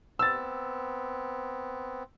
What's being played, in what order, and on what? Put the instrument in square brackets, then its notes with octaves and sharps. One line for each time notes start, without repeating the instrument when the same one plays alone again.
[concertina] B3 C4 [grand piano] E6 A6